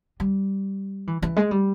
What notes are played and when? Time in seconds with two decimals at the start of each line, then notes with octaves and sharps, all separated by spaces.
0.20 G3
1.07 E3
1.22 E3
1.36 G#3
1.51 G3